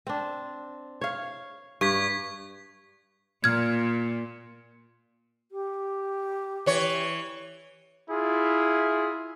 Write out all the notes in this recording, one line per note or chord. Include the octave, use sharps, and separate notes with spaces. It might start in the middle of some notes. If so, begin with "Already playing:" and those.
C4 D4
C#5 F5
G2 C#6 G#6 B6
A#2 F6 G#6
G4
E3 C#5
E4 F4 G#4